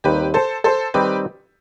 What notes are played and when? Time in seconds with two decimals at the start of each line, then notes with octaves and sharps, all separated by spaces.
0.04 D#2 D#3 G3 C4 D#4 G4 B4
0.34 A4 C5
0.64 A4 C5
0.94 D#3 G3 C4 D#4 G4 B4